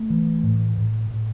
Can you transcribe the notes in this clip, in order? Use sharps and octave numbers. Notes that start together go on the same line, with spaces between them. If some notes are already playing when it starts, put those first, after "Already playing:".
Already playing: A3
E3
A2
A2
A2